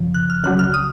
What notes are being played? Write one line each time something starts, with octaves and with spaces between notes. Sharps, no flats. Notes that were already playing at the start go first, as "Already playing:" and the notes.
Already playing: F#2 C#3 F3
F#6
F6
C#2 C#3 F#3 F#6
F6
D#6